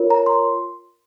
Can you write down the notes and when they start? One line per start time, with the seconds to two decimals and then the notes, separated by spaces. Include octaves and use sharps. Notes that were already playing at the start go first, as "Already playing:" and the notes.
Already playing: F4 A#4 C#5
0.10 A#5
0.26 C6